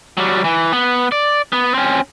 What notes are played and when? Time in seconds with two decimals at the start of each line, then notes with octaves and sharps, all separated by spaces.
0.17 F#3 G3
0.44 E3
0.73 B3
1.12 D5
1.53 B3
1.74 C4 C#4